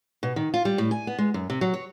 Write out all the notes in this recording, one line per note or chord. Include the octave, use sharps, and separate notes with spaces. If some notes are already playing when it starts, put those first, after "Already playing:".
B2
D#3
F4
G3
A2
G#5
B3
G#3
F#2
C3
F#3
C#5